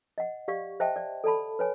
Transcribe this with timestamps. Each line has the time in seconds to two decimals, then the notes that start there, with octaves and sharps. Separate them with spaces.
0.18 D#5 F#5
0.48 G4 D5 F5 C#6
0.80 C5 D#5 E5 G5 A5
0.96 D5
1.24 A4 D5 A5 B5
1.59 B4 C#5 G#5